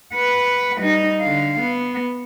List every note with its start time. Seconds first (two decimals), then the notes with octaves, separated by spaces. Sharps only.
0.14 B4 F#5
0.81 G3 D#4
1.21 D3 F5
1.60 B3